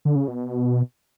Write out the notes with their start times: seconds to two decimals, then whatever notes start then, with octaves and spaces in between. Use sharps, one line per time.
0.05 D3
0.15 C#3
0.28 B2